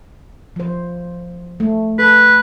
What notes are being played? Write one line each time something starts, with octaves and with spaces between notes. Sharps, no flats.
F3 C5
A3
A4 B4